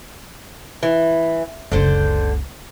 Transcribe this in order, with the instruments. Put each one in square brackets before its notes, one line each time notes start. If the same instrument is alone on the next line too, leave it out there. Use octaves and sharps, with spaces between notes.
[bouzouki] E3
[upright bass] F#1 C#2 [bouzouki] D3 C5